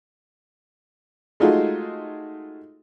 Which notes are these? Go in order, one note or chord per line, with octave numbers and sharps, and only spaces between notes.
G#3 A3 D#4 F4 F#4 G#4